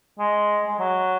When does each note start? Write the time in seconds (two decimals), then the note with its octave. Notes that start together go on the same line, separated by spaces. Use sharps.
0.19 G#3
0.68 G#3
0.79 F#3